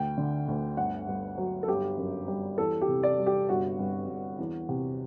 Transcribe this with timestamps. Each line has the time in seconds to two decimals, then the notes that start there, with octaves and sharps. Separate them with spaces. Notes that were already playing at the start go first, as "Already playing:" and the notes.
Already playing: D2 G5
0.17 D3
0.48 D2
0.77 G1 F#5
1.07 G2
1.38 F#3
1.63 A4
1.68 G1 G4
1.98 F#2
2.28 G3
2.58 E2 A4
2.82 G4
2.88 C3
3.03 D5
3.18 G3
3.27 G4
3.49 G1 F#4
3.79 G2
4.08 G1
4.39 E2
4.69 C3